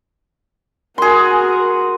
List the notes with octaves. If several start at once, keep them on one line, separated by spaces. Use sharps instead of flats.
F#4 G#4 A#4 C6